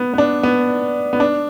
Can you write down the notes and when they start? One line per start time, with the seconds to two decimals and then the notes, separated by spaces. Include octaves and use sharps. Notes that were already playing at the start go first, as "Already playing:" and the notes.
Already playing: B3
0.13 B3
0.18 D4
0.43 B3
1.13 B3
1.20 D4